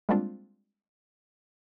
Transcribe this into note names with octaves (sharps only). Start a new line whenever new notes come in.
G3 G#3 A#3 C4 D4 F4